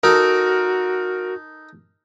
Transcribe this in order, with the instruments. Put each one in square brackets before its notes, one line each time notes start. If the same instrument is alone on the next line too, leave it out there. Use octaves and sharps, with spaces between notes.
[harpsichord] D#4 A4 [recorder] F#4 [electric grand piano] A#4